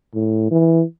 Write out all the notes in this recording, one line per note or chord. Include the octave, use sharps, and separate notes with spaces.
A2
E3